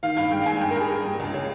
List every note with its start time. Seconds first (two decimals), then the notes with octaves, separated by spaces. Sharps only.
0.03 D#3 F5
0.17 G2 F5
0.31 G#3 G5
0.46 G2 G#5
0.61 G2 G5
0.71 A#4
0.76 G2 G#4
0.90 G2
1.05 G2
1.19 C#2
1.34 C#3